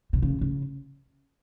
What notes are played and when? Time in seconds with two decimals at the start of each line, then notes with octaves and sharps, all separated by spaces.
0.13 C3
0.22 C#3
0.41 C#3